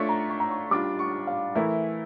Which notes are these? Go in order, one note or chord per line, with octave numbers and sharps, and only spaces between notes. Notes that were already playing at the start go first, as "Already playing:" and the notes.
Already playing: A3 D4 F4 C#5 E5 C#6
A#5
C#6
A#5
C#6
G3 D4 F4 D6
C#6
F5
E3 A3 E4 A#4 E5